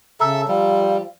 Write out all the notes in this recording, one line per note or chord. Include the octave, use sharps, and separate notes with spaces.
C#3 A4 E5 A#5 E6
F3 G3